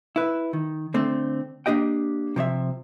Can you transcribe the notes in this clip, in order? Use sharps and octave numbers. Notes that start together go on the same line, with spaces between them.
E4 B4
D#3
D3 A3 C4
A#3 D4 G4 D#5 G5
C3 F3 C#5 E5